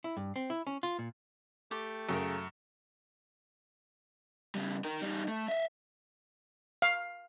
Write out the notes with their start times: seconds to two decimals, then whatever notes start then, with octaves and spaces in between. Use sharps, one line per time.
0.04 E4
0.17 G2
0.36 C4
0.50 E4
0.67 C#4
0.83 F4
0.99 A#2
1.71 A3 G4 D6
2.09 F#2 C#3 A#4 G5
4.55 C#3 G3
4.84 D#4 A#4
5.02 G3 D#4
5.28 A3
5.48 D#5 E5
6.82 F5